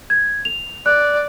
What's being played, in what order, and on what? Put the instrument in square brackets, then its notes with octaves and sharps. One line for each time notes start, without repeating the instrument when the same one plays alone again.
[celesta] G#6
F7
[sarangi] D5 [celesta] F#6